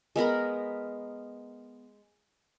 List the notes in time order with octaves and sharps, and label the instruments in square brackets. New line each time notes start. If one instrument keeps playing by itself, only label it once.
[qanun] G#3 B3 A#4 B5